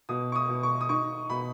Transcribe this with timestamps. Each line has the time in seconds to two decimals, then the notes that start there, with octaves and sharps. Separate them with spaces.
0.09 B2 D#6
0.32 C#6
0.35 D#6
0.49 B2
0.63 C#6
0.81 D#6
0.89 D#4 C#6
1.30 B2 B5